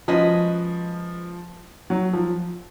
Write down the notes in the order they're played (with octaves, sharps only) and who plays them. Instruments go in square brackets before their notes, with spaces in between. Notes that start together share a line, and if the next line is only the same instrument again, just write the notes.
[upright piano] F3 [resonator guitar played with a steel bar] G#3 C#4 F#4 B4 D#5
[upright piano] F#3
F3